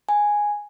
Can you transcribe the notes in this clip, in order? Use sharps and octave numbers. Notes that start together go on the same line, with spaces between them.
G#5